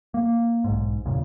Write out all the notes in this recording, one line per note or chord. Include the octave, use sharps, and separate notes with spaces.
A#3
B1 G#2
E2 G2 A#2 C#3